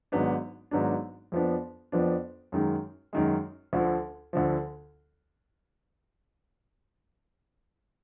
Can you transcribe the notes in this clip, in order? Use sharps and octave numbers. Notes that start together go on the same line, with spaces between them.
G#1 G#2 F#3 B3 D4
G#1 G#2 F#3 B3 D4
F2 F3 B3 D4
F2 F3 B3 D4
F#2 D#3 G#3
F#2 D#3 G#3
D2 D3 F3
D2 D3 F3